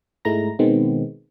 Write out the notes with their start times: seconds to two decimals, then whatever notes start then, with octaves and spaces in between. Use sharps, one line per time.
0.25 G#2 G#3 A3 E4 A#5 A#6
0.59 B2 D#3 G#3 B3 C4